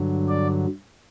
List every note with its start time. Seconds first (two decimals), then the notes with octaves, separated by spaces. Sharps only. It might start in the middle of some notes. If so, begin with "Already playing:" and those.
Already playing: G2 D3 F#3
0.28 D5